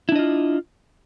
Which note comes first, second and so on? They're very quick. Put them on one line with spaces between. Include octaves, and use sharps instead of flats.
E4 D4 D#5 F4